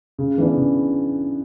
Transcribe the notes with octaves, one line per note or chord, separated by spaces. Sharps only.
C#3
E3 B3 D4
C#3